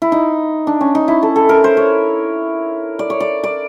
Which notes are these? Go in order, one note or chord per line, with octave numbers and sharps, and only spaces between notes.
E4
D#4
D4
C#4
D#4
E4
A4
A4
A#4
C5
C#5
D5
C#5
D5
D5